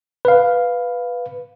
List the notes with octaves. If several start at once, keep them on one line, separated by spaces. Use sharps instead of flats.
B4 F5